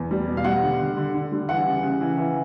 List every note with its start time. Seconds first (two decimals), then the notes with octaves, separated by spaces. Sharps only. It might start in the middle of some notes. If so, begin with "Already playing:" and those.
Already playing: E2
0.11 G3
0.27 B2
0.37 F5
0.44 G3 F#5
0.63 D3
0.79 D3
0.97 D3
1.14 D3
1.31 G3
1.49 E3 F#5
1.66 C#3
1.83 C#3
2.01 E3
2.18 E3